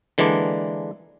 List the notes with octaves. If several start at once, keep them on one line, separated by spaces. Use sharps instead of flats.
D3 E3 G#3 A#3 D4